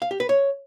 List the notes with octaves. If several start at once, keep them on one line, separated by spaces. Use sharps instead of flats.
F5
G4
B4
C#5